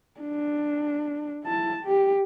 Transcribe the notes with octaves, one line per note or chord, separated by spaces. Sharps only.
D4
E4 A5
G4